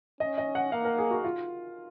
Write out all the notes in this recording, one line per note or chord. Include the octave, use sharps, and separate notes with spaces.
C#4 D#5
D#5
F#5
A#3 F5
A#4
G#4
F#4
F4